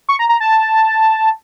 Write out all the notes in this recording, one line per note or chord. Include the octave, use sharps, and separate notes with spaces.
C#6
A#5
A#5
A5